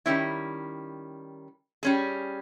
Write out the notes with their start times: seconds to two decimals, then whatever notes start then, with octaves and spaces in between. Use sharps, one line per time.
0.06 D#3 G3 A#3 C#4 E4
1.83 G3 C#4 G#4